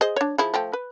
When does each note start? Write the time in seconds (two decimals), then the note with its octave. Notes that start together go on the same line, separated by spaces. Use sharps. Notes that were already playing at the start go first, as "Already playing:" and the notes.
0.01 G#4 C5 D#5
0.16 D4 C#5
0.38 F3 E4 G#4
0.54 F3 A3 G5
0.73 B4